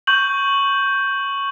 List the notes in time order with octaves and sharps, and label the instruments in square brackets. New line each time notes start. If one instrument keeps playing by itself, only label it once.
[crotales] C#6 G6 F#7